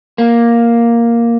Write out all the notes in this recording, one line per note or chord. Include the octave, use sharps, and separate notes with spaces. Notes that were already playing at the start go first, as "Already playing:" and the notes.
A#3